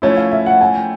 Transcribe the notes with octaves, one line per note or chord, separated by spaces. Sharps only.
F3 A3 C#4 E4 C#5
F5
E5
F#5
G#5
G5